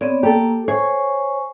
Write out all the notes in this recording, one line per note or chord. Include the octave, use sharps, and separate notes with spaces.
B3 C4 C#5 D5
A#3 G4 A4
C5 C#5 G#5 C#6